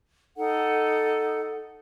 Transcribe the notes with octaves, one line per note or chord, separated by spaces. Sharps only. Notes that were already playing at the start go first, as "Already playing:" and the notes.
D#4 A4 F#5